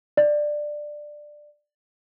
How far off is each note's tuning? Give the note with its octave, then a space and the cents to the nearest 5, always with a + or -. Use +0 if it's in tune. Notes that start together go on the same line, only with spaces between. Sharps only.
D5 +15